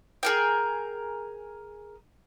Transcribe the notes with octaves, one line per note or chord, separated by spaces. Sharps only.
G#4 A#4 G5